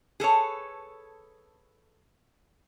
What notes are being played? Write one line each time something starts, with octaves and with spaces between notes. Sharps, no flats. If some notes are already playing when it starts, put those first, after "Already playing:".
G#4 A4 B4 C#5